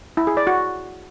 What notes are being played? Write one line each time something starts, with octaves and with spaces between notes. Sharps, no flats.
E4
G#4
D5
F#4